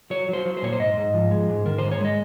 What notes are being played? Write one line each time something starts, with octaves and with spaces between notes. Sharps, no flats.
F#3 C#5
F#3 C5
F#3
C5
A#2 C#5
C5
G#2 D#5
G#2
F3
G#3
G#2
D#3 A#4
G#2 C5
C#5
G#3 D#5